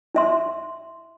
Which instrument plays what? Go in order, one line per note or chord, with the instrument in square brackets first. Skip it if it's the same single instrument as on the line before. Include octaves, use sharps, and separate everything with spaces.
[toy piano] E4 E5 C6